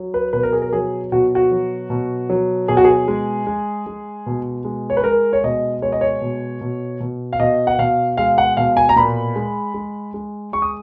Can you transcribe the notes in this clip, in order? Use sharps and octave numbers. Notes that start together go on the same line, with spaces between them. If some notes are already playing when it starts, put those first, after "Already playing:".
Already playing: F#3
B4
B2 B4
A#4
G#4
A#4
F#3 G#4
B2 F#4
F#4
F#3
B2
F#3
B2 G#4
F#4
G#4
G#3
G#3
G#3
B2
G#3
C#5
B4
G#3 A#4
C#5
B2 D#5
G#3 C#5
D#5
C#5
B2
B2
B2
F5
B2 D#5
F#5
B2 F5
G#3 F5
F#5
B2 F5
G#5
A#5
A#2 B5
G#3
G#3
G#3
G#3 C#6
D#6